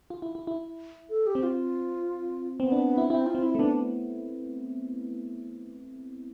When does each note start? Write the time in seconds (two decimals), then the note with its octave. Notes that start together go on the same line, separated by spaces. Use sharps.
0.10 F4
0.22 E4
0.35 E4
0.47 E4
1.10 A4
1.27 G4
1.35 C4
1.43 F4
2.60 B3 C4
2.72 D4
2.98 E4
3.10 C4 E4
3.27 F4
3.35 C4
3.43 E4
3.55 A3
3.59 B3 D4